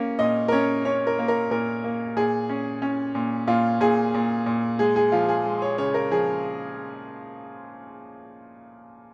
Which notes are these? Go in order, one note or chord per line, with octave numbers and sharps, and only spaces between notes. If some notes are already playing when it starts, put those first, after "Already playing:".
Already playing: A#3 C#4
A#2 D#5
A#4
C#4 C#5
C#4 C#5
A#4
A#3
A#4
A#2 A#4
A#3
A#2 G#4
C#4
C#4
A#2
A#2 F4
A#2 G#4
A#2
A#2
G#3 G#4
G#4
F3 F4
G#4
G#3
C#5
C#3 C#5
A#4
F3 G#4